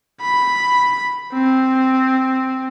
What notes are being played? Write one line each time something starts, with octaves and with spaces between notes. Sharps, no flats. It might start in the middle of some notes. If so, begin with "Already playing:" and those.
B5
C4